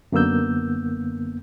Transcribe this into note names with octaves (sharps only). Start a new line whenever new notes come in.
F#2 D3 A#3 B3 E6 G6